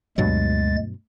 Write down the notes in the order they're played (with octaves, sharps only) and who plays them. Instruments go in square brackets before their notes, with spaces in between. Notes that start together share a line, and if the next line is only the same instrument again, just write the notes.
[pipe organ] D2 G#3 A6 [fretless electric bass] G2 B2 F#3